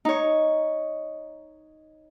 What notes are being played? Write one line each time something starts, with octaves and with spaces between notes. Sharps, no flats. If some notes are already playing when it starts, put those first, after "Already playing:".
D#4 C#5